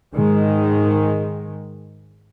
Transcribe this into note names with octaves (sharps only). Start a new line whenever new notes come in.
G#2 D#3 G#3